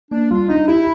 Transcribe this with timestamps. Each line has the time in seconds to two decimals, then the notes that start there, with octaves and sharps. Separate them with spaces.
0.11 A#3 D4
0.31 G3 F4
0.49 D4 D#4
0.67 E4 G4